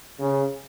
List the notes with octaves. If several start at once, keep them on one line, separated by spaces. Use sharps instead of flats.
C#3